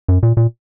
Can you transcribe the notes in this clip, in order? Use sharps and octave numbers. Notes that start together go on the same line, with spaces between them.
F#2
A#2
A#2